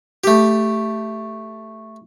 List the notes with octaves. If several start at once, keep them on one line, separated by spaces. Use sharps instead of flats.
A3 G4